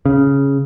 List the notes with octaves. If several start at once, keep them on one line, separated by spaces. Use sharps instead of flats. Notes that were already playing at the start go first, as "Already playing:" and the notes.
C#3